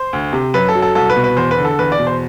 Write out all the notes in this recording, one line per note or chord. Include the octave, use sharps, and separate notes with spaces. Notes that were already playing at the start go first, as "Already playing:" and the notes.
Already playing: C5
D2
C3
F#2 B4
A4
F#3
A4
C2 A4
B4
B2
B4
E2 C5
B4
D3
A4
E2 B4
D5
B2
C5